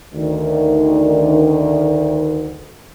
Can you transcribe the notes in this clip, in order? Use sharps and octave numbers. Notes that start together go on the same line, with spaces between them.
D2 D#3